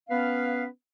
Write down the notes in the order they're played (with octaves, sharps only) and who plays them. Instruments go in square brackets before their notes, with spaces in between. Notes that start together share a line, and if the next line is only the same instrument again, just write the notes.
[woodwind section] B3 C#4 B4 F5